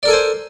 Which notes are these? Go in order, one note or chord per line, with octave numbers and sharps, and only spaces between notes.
A4 A#4 C5 D5 G#5